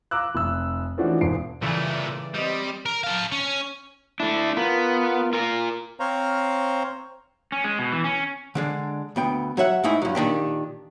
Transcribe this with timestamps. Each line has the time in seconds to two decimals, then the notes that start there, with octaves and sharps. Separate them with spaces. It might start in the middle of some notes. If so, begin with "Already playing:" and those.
0.11 F5 A#5 D6 E6 F#6
0.35 F1 E6
0.98 E3 F3 A3 C#4 D4 F#4
1.21 E1 G#2 C7 D7
1.62 A#2 C#3 E3 G3 A3 D5
2.34 G3 C4 G4 D#5
2.86 A#4
3.04 A4 F5
3.32 C#4
4.20 A3 D4 E4
4.57 B3 F4 A#4
5.33 F4 A#4
6.00 C4 C5 C#5 F5 A#5
7.52 C#4
7.64 G#3
7.79 B2
7.92 E3
8.04 C#4
8.55 D3 G#3 D4
9.16 D2 B3 G5
9.57 F#3 C#5 E5 F#5
9.84 G#2 A3 D#4 E4 G#5
10.02 G2 F#3
10.15 A#2 D#3 D4 G4